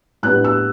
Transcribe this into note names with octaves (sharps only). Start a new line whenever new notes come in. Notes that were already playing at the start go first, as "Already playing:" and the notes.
A2 G3 B3 D4 F#6
E6